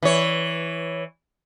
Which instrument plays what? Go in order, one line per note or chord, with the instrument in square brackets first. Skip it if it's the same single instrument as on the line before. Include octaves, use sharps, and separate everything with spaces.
[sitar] E3 C#5